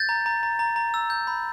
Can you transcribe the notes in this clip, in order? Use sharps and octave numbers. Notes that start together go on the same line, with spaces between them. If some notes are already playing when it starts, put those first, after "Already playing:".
Already playing: G6 A6
A#5
A#5
A#5
A#5
A#5
E6
G6
B5